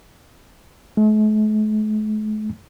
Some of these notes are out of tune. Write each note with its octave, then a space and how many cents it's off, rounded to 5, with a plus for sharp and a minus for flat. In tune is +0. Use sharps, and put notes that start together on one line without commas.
A3 -45